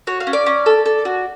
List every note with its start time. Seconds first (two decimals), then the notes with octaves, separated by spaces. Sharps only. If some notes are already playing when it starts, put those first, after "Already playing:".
0.07 F#4 C#5
0.20 F5
0.27 C#4
0.33 D5
0.46 C#4
0.66 A4
0.85 A4
1.05 F#4